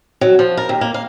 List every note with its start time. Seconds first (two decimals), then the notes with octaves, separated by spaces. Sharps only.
0.21 F#3
0.39 F3
0.57 A#4
0.69 D#2
0.81 A#3
0.94 F5